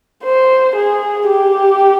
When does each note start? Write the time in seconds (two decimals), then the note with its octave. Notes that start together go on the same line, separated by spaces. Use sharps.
0.24 C5
0.76 G#4
1.28 G4